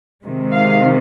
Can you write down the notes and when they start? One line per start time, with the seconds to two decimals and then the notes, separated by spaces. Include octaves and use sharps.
0.25 C3 D#3 G#3
0.53 F5